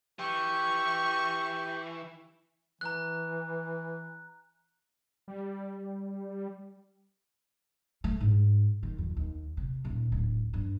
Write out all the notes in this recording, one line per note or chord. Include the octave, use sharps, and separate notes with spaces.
E3 G4 C#6
E3 A#5 F#6
G3
A3
G#2
D#3
F2
D#2
C3
D#1
D1
G2